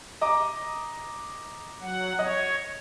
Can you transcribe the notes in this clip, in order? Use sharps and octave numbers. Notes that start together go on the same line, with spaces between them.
D#5 A#5 D6
F#3 F#5
C#5 D#5